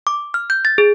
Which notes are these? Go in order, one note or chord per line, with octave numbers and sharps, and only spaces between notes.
D6
F6
G6
A6
G#4